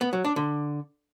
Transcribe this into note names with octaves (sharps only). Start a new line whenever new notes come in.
B3
F#3
D4
D3